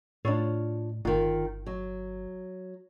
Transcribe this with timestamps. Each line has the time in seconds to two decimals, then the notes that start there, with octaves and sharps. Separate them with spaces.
0.25 A2 D4 F4 C#5
1.05 G1 D#3 F4
1.66 F#3